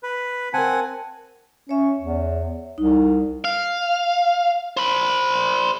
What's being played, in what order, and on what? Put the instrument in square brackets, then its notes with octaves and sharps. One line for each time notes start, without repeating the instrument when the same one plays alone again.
[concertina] B4
[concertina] C4 F#5 G#5 [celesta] A#4 A5
[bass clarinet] C#4 [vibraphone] C#5 E5
[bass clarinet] E2
[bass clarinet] C2 [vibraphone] D#4
[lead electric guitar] F5
C5 B5